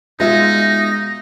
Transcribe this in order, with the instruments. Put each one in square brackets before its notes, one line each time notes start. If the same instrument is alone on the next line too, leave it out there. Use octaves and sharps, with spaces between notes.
[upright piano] B2 G#3 [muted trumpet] D#4 [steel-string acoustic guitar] F4 E5 [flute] A#6